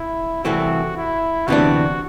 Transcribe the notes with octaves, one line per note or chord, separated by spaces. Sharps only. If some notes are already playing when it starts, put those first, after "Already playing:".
Already playing: E4
C2 C3 E3 A3 C4 F#4
E4
D2 C3 E3 B3 D4 F#4